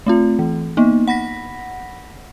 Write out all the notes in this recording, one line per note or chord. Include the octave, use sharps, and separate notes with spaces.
A3 C4 F4
E3
A#3 B3 D#4
F#5 B5 A#6 B6